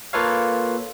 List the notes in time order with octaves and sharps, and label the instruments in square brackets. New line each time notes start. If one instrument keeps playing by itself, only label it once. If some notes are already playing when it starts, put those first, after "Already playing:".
[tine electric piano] A#3 F4 A4 B4 C#5 F5